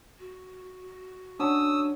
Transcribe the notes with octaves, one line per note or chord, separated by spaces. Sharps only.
F#4
F#3 C#4 D4 D#6 E6